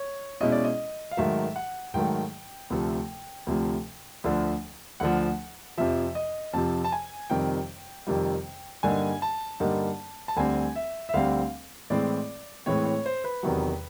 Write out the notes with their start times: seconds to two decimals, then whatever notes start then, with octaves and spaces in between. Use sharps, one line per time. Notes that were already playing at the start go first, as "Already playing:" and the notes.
Already playing: C#5
0.41 B2 G#3 C#4 E4 D#5
0.52 D5
0.64 D#5
1.11 F5
1.17 G#2 D#3 F#3 A3 E5
1.56 F#5
1.94 G#2 D#3 F#3 A3 G5
2.70 D2 C3 F3 A3
3.47 D2 C3 F3 A3
4.24 D2 D3 F3
5.00 D2 D3 F3 F#5
5.78 F2 C3 F3 E5
6.15 D#5
6.53 F2 C3 F3 A5
6.84 A5
6.92 G#5
7.30 F2 C3 D#3 G3 G5
8.07 F2 C3 D#3 G3
8.83 G2 D3 G3 A#3 D#4 G#5
9.22 A5
9.60 G2 D3 G3 A#3 D#4
10.28 A5
10.36 D2 D3 G3 C4 G#5
10.76 E5
11.09 E5
11.14 D2 D3 G3 C4 F5
11.90 A2 E3 G#3 C4 D5
12.66 A2 E3 G#3 C4 C#5
12.85 C#5
13.06 C5
13.24 B4
13.43 E2 C3 D#3 F#3